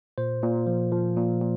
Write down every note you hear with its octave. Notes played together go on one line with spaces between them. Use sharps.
A#2 C5
A#2
F3
F3
A#2
A#2